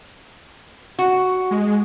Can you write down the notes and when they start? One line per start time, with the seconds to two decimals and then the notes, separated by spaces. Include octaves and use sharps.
0.99 F#4
1.51 G#3